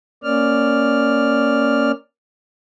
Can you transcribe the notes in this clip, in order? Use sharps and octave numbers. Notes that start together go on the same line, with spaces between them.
A#3 C#4 D5 F6